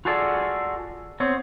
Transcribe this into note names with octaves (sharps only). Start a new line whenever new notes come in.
F4 F#4 G#4 A4 D5
B3 C4 C#5